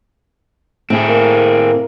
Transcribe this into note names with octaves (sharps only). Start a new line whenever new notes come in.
A2 C4 G#4
A#3